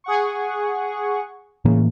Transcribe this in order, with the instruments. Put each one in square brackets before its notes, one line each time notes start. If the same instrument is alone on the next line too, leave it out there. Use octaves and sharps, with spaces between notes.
[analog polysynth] G#4 F#5 C#6
[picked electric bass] A2 E3 A#3 [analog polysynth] C#3